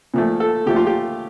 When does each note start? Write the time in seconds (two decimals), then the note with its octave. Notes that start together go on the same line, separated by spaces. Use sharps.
0.14 A#2 F3 A3
0.40 A4
0.66 A#2 F3 A3 G4
0.76 F4
0.87 G4